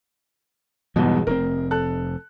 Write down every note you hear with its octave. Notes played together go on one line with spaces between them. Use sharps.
E2 G#2 B2 E3 F#3 G3
F1 G#2 C4 A#4
A4 F#6